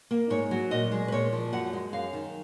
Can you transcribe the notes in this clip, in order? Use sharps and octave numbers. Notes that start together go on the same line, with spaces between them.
A#3
G#2 C#5
F#3
A#2 D#5
G#3
B4
A#2 C#5
F3
F#2 F#5
G#3
F#2 F5
D#3